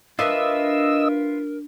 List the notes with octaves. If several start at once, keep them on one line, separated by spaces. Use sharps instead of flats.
D4 F4 A#4 B4 D#5 E5 E6